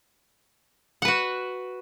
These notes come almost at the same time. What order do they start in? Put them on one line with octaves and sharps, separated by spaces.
F#5 B4 F#4